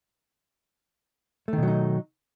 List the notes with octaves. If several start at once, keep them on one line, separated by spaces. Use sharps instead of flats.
B2 D#3 F#3 A3 D#4